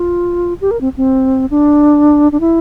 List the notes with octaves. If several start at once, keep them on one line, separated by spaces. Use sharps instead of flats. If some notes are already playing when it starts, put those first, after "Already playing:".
Already playing: F4
G4
A#4
C4
C4
D4
D4
E4